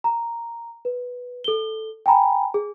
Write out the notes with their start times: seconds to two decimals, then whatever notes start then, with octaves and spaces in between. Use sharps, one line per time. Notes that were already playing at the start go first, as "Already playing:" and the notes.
0.04 A#5
0.85 B4
1.44 A4 G7
2.06 G5 G#5 A#5 B5
2.54 G#4